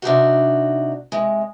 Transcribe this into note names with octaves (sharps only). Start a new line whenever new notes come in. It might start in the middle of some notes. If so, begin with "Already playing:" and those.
C3 D4 D#4 F#4
C3 G#3